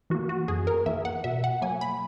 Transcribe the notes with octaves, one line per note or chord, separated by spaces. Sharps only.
E3 A#3 F#4
F#4
F#2 G#4
A#4
E3 A#3 E5
F#5
B2 E5
F#5
F#3 A#3 G#5
B5